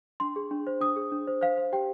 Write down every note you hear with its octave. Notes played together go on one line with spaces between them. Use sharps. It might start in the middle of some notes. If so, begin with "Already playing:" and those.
D4 C6
G#4
D4
C5
D4 D#6
G#4
D4
C5
C5 F5
C5
G4 G5